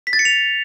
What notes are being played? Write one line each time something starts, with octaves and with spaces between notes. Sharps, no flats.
B6
A6
C#7
F7